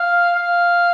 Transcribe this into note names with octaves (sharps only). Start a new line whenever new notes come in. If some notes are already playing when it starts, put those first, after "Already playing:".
Already playing: F5
F5